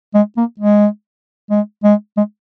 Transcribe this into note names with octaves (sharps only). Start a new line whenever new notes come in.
G#3
A#3
G#3
G#3
G#3
G#3